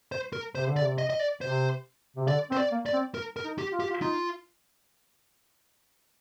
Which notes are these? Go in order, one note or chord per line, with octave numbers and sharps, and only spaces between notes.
C5
A#4
C3 C5
D3
D5
C3
D#5
D#5
D5
C3 C5
C3
D3 D5
C4 C5
D5
A#3
D5
C4
A#4
A#4
D#4
G4
F4
G4
F4
D#4 F4